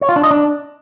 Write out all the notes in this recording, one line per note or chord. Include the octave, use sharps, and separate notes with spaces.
C#5
F4
D4
D#5
D4